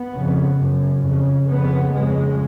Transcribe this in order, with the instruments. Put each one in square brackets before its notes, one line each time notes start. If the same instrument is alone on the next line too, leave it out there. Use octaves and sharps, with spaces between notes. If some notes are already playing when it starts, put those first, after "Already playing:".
Already playing: [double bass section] B3
F2 C#3
F#2 C#3
F2 C#3
F2 C#3 B3
F2 C#3 G#3